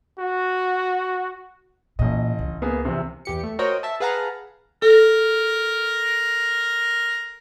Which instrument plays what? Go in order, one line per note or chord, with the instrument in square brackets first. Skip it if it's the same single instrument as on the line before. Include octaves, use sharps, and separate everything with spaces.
[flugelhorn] F#4
[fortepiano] A1 D#5 [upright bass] A#2
[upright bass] C#2 D3
[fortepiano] A#3 B3 G#4
E2 C3
[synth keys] E2 G4 C#7
A3
F#4 A#4 C5 C#5 D#5 G5
E5 A5
G#4 B4 F5 F#5 A5 A#5
[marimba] A4 [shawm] A#4